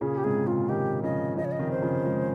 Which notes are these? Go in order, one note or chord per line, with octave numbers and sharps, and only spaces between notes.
A#2 C#3 G#4
G4
G#2 C3 G#4
A#2 C#3 F4
C3 D#3 G4
C#3 F3 D#5
C#3 F3 D#5
C#5
D#5
C3 D#3
C5
C#3 F3
F3 G#3